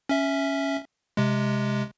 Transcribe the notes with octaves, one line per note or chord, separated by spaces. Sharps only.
C#4 E5
C3 G#3